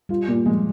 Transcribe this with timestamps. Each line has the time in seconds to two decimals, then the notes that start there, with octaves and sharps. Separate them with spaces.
0.09 G3 F4
0.28 A#2
0.45 F3 G#3